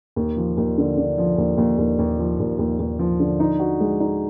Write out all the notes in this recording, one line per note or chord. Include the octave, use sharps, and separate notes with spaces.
D#2
F3
D#2
D3
D3
F3
D#2
D#2
D#2
D#2
F3
D#2
D#2
D#2
F3
D3
D#4
F#4
G#3
D#4